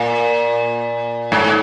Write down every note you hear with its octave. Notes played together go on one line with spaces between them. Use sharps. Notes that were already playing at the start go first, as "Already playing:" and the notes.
Already playing: A#2
G#2